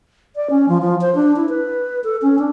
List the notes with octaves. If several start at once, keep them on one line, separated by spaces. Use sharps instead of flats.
D5
C#4
F3
F3
C5
D4
E4
B4
A4
C#4
D4